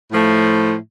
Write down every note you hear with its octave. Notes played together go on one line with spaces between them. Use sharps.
A2 F3 A3